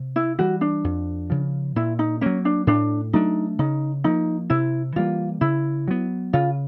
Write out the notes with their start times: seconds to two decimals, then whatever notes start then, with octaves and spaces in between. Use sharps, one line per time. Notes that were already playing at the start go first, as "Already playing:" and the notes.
Already playing: C3
0.16 E4
0.39 E3 G3 F#4
0.61 D4
0.84 F2
1.30 C#3 F3
1.76 A#2 E4
1.99 D#4
2.21 F#3 A#3 C#4
2.45 D4
2.67 A2 D4
3.13 F#3 A3 D4 D#4
3.59 C#3 D#4
4.04 F3 A#3 D#4
4.50 C3 E4
4.96 E3 G3 A#3 F4
5.41 C#3 E4
5.88 F#3 B3
6.33 C#3 F4